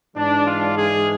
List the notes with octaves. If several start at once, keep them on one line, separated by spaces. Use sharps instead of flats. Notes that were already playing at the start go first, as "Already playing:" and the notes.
G#2 E3 G#3 D4
F4
G#4